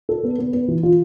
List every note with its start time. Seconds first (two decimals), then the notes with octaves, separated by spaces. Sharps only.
0.09 A4
0.24 B3
0.38 B3
0.53 B3
0.68 E3
0.83 F4